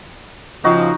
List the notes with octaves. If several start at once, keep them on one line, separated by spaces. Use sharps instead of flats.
C#3 F3 D#4 F#4